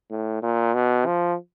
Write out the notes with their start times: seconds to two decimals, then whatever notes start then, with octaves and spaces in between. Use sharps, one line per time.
0.10 A2
0.42 A#2
0.74 B2
1.06 F3